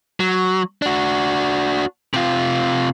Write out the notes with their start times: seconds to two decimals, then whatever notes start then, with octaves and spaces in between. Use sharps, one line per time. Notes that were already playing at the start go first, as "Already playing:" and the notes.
0.20 F#3
0.82 D4 F#4
2.14 C3 F4